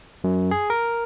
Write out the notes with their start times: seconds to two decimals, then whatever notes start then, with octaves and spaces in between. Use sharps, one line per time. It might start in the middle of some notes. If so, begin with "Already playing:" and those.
0.24 F#2
0.51 G#4
0.70 A#4